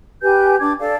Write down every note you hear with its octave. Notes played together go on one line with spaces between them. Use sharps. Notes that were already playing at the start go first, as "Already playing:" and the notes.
G4 B4 G#5 G6
D4 D6 G#6
A4 D5 F5